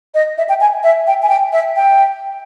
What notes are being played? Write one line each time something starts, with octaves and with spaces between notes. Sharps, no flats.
D#5
E5
G5
G#5
E5
G5
G#5
G5
E5
G5